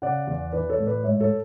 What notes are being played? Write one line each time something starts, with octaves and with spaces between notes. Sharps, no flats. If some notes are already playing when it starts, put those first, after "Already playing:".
C#3 D5 F#5
E2
E3 B4 D5
A4 C#5
A2
B4 D5
G#2 C#5 E5
A4 C#5